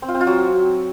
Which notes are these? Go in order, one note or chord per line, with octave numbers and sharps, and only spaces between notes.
C4
F4
C4
F4
F#3